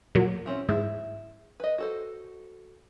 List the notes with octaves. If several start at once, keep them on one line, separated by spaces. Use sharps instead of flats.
A#2 F#3 G4
E3 C4 C#4
G#2 E4
B4 D#5
F#4 A4 C5